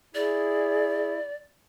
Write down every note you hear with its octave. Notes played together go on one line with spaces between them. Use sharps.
E4 G#4 D5